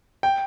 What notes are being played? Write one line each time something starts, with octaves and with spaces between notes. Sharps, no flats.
G5